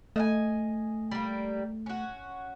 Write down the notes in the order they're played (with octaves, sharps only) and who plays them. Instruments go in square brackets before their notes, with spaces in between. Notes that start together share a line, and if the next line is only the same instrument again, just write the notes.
[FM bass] A3 [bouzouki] D#5 F5 G#5
[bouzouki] G3 A#3
C#4 F#4